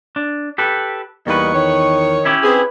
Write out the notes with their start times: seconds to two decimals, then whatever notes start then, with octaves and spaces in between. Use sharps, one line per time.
0.16 D4
0.58 G4 A4 B4
1.27 E2 G3 A#3 D#4 B4 C#6
1.54 D#3 C#5
2.25 C#4 E4 G4
2.43 C4 G#4 B4